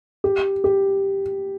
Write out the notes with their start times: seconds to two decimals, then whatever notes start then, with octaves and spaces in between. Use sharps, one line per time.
0.24 G4
0.64 G4